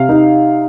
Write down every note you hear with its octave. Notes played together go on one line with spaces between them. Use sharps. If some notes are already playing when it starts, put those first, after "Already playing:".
Already playing: C3 F5
D#4